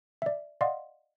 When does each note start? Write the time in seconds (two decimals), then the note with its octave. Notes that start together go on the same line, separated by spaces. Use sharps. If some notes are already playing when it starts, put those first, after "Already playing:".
0.22 D5 E5
0.61 D5 D#5 F5 F#5 C6